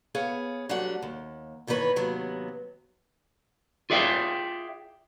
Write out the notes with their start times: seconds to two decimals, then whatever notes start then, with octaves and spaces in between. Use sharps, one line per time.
0.15 B3 G#4 C#5 F5
0.69 F#3 G3 A3 C4 D4 F#5
1.03 D#2
1.67 G2 D#3 E3 D4 B4 C#5
1.96 D#2 C3 F#3 B3
3.90 F4 G#4 D5 E5 F5 G5